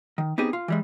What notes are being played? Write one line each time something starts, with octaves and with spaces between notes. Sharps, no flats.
D#3
B3 C4 D#4 G4 G#4
F4
E3 G3 G#3